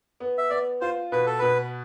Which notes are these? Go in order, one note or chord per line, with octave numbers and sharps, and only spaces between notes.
B3
E5
B3 D5
F4 C5
B2 B4
A4
B2 B4